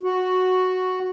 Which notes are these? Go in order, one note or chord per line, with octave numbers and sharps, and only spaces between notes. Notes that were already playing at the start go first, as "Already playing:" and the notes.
F#4